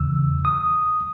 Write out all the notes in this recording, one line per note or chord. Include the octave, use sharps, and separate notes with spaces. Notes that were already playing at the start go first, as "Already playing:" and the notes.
Already playing: E2 C#3 E3 E6
D#6